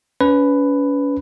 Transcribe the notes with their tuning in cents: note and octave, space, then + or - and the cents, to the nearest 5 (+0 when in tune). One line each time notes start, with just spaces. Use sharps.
C#4 +35 B4 +10